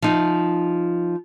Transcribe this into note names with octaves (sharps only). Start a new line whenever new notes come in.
F3 D#4